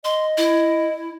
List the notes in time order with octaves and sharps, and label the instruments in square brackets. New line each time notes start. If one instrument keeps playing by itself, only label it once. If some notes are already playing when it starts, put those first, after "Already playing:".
[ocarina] D#5 [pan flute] C6
[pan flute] E4